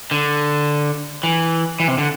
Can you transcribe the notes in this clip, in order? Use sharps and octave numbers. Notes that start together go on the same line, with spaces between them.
D3
E3
E3
C3
D3